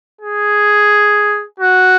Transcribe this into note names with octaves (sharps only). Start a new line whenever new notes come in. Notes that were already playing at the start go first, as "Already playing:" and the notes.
G#4
F#4